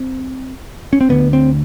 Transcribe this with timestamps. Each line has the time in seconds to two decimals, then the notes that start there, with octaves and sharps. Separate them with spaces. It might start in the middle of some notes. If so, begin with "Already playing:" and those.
Already playing: C4
0.93 C#4
1.01 C4
1.09 D2 D3 B3
1.33 C4